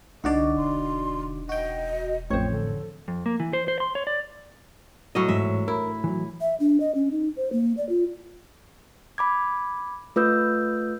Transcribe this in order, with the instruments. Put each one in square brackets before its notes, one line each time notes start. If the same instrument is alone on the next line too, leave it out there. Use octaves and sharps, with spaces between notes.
[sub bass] C2 [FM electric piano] D3 F#4 D5 [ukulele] D4 D#4 [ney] D#5
[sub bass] E1 [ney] C6
[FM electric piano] F#4 G5 [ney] D#5
[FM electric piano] A1 F2 [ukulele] C5 C#5 [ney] G5
[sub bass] D3 [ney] A4
[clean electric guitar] F2
A#3
E3
C5
C5
C6
C#5
D5
[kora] A2 F#3 D#5
[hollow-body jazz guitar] E2 G#2 [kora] E5
[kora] E4 [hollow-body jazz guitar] A#4
[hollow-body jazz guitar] E3 F#3
[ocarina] E5
D4
D#5
C#4
D#4
C5
A#3
D5
F4
[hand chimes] B5 D6 G#6
A3 F4 B4 D#6 E6 G6